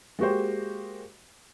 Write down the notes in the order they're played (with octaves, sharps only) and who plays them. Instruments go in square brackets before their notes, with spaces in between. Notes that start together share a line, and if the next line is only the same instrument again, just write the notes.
[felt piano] G#3 A#3 F#4 G4 C5